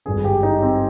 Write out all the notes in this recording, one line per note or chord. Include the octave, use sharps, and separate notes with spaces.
G#1 G2 D3 G#4
G4
D#4
C4